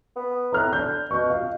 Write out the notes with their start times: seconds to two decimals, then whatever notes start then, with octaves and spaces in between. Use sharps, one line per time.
0.16 B3
0.52 A2 A#5 F6 F#6
0.73 D3 G6
1.11 B2 C#6 G6
1.30 F4 D#5